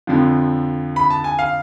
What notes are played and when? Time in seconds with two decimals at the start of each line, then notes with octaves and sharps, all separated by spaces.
0.07 F2 D3 F3
0.96 B5
1.10 A5
1.24 G#5
1.39 F5